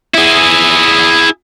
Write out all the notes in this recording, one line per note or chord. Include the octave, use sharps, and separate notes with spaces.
E4 G#4